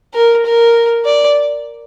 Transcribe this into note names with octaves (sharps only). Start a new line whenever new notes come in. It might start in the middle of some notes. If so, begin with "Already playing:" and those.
A#4
A#4
D5